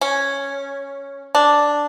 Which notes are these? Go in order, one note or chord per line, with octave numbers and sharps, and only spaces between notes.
C#4
D4